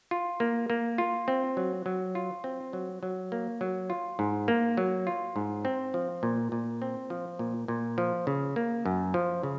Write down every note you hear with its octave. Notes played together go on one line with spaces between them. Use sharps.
F4
A#3
A#3
F4
C4
F#3
F#3
F4
C4
F#3
F#3
A#3
F#3
F4
G#2
A#3
F#3
F4
G#2
C4
F3
A#2
A#2
C4
F3
A#2
A#2
F3
C#3
A#3
F#2
F3
C#3